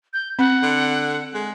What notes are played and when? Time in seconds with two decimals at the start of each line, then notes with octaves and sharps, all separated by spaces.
0.13 G6
0.39 C4 F#5
0.63 D3
1.34 G#3